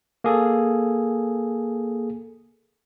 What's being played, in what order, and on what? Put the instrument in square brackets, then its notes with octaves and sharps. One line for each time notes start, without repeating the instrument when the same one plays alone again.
[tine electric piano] A#3 G#4 A4